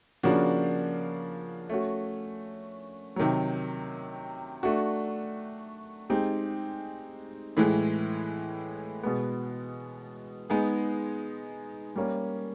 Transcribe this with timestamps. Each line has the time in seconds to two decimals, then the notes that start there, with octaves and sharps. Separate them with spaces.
0.23 C#3 F3 A#3 D4 F#4
1.69 A3 C#4 F#4
3.16 C3 D#3 F#3
4.63 A3 D4 F#4
6.10 G#3 C4 D#4 G4
7.57 A2 E3 G#3
9.03 B2 G#3 B3
10.50 G#3 B3 D#4 G#4
11.96 G3 A#3 C#4